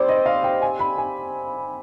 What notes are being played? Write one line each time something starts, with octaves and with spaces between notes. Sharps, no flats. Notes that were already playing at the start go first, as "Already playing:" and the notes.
Already playing: G3 C4 C5 D5
D#5
F5
G5
G#5
B5
G#5